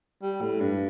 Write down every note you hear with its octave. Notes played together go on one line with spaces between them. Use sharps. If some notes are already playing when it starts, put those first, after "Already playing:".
G3
A2
G2